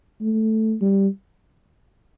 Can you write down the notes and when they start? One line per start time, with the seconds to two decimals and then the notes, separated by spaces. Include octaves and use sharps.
0.21 A3
0.81 G3